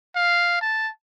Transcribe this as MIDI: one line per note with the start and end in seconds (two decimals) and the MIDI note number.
0.15 0.59 77
0.61 0.90 81